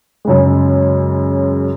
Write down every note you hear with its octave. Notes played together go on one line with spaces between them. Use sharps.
F#2 C#3 G#3